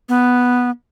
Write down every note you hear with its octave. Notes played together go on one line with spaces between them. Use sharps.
B3